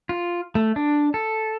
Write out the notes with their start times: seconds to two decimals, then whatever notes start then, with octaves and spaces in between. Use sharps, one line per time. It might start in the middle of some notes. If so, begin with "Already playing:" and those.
0.09 F4
0.55 A3
0.76 D4
1.14 A4